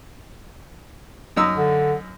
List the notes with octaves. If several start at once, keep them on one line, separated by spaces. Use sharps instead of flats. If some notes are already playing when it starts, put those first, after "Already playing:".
F#2 D#4 E6
D3